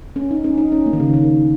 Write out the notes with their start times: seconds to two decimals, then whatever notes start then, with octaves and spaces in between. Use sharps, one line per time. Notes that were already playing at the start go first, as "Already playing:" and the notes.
0.16 C#4
0.31 D#4
0.44 C#4
0.58 D#4
0.72 C#4
0.86 A#3
0.93 D#3
1.00 C#3
1.14 D#3